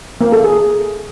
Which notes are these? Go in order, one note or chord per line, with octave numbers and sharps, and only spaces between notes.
A#3
A4
G#4